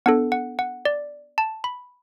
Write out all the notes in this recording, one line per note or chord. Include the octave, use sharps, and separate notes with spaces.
B3 D4 A4 F#5
F#5
F#5
D5
A5
B5